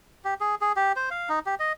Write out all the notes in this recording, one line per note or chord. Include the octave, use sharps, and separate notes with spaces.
G4
G#4
G#4
G4
C5
F5
D#4
G4
D#5